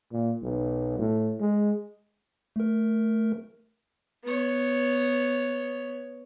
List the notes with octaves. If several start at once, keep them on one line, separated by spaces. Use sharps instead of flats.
A#2
B1
A2
G#3
A3 A#4
B3 C#5